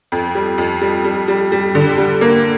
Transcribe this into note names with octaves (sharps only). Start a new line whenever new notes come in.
F2
G3
F2
G3
G3
G3
G3
D3
G3
A#3